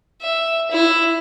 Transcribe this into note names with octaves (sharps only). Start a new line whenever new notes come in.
E5
E4